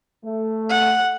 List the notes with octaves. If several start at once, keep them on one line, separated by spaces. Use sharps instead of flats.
A3
F#5